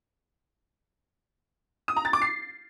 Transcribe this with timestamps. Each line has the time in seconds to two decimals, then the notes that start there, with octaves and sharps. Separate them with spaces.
1.88 D#6
1.96 A#5
2.05 A6
2.13 D6
2.22 C7